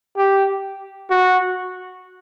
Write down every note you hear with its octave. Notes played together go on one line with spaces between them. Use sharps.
G4
F#4